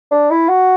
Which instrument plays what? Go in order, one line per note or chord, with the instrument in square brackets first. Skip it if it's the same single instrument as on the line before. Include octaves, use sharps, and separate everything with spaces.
[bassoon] D4
E4
F#4